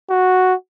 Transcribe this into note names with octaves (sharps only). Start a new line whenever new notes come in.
F#4